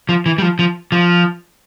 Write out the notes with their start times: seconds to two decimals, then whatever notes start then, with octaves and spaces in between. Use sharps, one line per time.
0.09 F3
0.26 E3
0.38 G3
0.42 F3
0.59 F3
0.92 F3